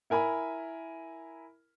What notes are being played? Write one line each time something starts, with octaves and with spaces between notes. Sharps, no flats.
E4 A#4 G#5 B5